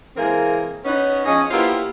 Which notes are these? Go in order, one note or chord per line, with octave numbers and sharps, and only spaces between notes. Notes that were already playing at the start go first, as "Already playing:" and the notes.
E3 G#3 A#3 C4 G#4 A#4
B3 C#4 D#4
F3 C#4 G#4 D#5
A#3 B3 E4 F4 G4 C5